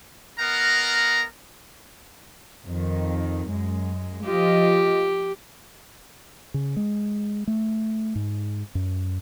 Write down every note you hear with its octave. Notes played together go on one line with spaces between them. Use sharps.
B3 A#4 D#5 F5 F#5 A#5
F2 D#3
F#2 G#3
F3 F4 G4 D#5
C#3
G#3
A3
G#2
F#2